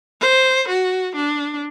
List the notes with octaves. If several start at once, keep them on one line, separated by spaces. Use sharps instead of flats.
C5
F#4
D4